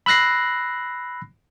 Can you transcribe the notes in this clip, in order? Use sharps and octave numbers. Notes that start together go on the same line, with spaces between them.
B5 E6 F#6 A#6 C7